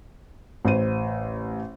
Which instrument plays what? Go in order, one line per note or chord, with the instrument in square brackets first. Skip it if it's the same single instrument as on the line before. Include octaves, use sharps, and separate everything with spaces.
[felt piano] A1 C5 D#7